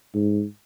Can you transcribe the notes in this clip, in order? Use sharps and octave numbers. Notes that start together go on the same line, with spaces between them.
G#2